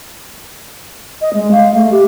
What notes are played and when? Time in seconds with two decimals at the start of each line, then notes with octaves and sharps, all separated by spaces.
1.21 D#5
1.34 G#3
1.52 F5
1.75 A3
1.91 G4